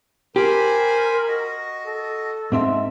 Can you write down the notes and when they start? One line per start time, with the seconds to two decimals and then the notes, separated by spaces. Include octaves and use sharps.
0.36 G4 A#4 C5 G#5 B5
1.28 F#4 D#5
1.85 A4
2.52 G#2 C4 E5